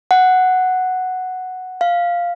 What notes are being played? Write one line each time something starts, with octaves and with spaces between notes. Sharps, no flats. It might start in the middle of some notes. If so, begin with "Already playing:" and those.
F#5
F5